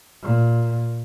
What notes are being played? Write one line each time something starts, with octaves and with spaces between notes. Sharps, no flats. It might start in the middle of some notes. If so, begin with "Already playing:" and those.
A#2